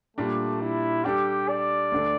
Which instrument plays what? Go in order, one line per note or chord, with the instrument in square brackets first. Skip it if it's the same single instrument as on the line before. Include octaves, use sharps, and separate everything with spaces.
[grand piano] A#2 G3 D4 [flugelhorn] A3
[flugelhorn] E4
[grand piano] G3 D4 A4 [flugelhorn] G4
[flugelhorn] D5
[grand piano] D2 D3 A3